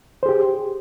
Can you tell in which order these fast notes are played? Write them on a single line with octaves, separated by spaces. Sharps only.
C5 G#4 G4